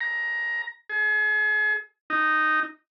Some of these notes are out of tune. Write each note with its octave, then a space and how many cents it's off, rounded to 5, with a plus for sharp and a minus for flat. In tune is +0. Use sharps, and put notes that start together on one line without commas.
A#5 +15
G#4 +40
D#4 -5